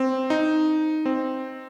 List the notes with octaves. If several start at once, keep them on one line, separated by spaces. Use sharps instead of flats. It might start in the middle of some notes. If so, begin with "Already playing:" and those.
Already playing: C4
D#4
C4